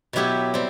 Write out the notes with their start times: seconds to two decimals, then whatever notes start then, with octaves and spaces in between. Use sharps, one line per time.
0.13 B2 F#3 B3 E4 G4
0.54 G3 C4